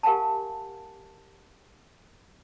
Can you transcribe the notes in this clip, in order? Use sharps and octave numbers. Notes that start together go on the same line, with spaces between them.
G4 A#4 F5 F#5 G#5 A5